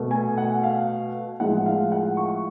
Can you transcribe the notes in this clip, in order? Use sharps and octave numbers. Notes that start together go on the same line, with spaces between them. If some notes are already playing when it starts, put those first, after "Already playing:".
Already playing: B2 A3
G#5
F#5
F5
A2 F3 G#3 F#5
F5
F#5
C#6